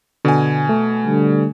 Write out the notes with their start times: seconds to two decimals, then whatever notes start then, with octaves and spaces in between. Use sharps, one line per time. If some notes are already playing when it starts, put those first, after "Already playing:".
0.25 B2 D3 G#5
0.69 A3
1.04 D3 G3